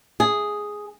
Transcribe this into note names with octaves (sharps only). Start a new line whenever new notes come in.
G#4